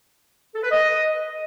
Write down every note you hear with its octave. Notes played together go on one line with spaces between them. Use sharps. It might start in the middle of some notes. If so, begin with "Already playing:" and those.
A4
B4
D#5